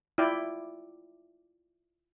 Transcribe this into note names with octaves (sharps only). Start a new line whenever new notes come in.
E4 F4 D5 G5